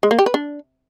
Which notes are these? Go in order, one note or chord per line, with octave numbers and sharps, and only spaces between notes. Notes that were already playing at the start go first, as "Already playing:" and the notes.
G#3
A#3
G4
B4
D4